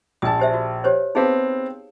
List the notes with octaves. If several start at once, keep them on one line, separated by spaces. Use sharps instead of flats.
A#1 G#5 A5 D#6
G4 C5 E5
F#4
G4 C5 C#5
B3 C4 D#4 G#4 F5